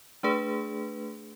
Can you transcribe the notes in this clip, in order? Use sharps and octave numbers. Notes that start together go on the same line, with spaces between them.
A3 D4 G#4 B4